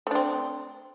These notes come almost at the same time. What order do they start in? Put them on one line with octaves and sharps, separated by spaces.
A3 D4 C4